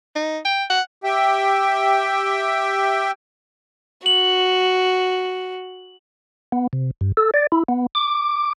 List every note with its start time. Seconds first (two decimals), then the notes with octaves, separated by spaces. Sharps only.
0.16 D#4
0.45 G5
0.70 F#5
1.04 G4 E5 G5
4.06 F#4 F#7
6.52 B3
6.73 C3
7.01 G2
7.17 A4
7.34 D5
7.52 E4
7.69 B3
7.95 D6